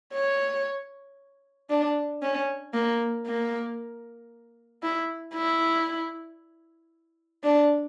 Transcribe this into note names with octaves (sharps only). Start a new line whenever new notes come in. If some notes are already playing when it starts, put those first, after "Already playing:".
C#5
D4
C#4
A#3
A#3
E4
E4
D4